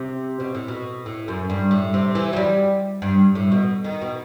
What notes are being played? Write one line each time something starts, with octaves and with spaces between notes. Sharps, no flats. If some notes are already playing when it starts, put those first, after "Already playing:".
Already playing: C3
B2
A2
B2
A2
F#2
G2
A2
C3
E3
F#3
G3
G2
A2
B2
D#3
B2